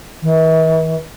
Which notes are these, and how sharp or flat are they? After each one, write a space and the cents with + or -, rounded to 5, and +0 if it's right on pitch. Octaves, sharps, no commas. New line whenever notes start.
E3 -45